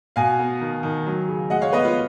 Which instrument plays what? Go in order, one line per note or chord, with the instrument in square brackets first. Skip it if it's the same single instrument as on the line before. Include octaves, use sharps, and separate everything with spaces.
[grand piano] B2 F5 G#5
B3
D#3
D#3
F#3
C#3
G#3 D#5 F#5
C#5 F5
B3 B4 D#5
F4